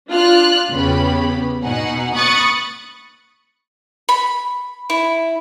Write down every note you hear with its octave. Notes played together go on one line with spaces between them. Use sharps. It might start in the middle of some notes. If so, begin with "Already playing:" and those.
D4 F4 F6 F#6
E2 C#3 B3 C#4 G4 B5
B2 D#4 F#5 G#5
B5 C#6 D#6 F#6 A6 C#7
B5
E4